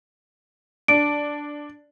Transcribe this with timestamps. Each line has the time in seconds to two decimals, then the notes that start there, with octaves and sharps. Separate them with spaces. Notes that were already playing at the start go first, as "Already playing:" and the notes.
0.88 D4 D7